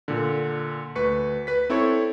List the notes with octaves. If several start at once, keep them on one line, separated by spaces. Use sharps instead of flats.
A#2 D3
D2 B4 C#6 C#7
B4 B6
C4 E4 A4 C#5 C#6